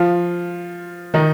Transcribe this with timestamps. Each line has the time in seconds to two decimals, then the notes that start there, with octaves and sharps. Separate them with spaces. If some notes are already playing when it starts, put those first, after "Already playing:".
Already playing: F3 F4
1.14 D#3 D#4